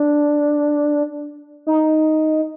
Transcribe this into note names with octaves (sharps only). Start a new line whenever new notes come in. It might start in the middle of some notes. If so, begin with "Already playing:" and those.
Already playing: D4
D#4